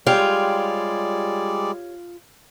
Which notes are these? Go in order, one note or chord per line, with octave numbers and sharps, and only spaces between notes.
G3 G#3 F4 G4 C#5 D5 G5